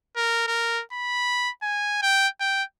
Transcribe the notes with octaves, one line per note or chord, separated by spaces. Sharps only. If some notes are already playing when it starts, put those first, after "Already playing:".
A#4
A#4
B5
G#5
G5
G5